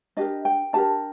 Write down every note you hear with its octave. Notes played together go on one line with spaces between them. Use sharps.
D4 G4 A#4 D#5
G5
D4 G4 A#4 A5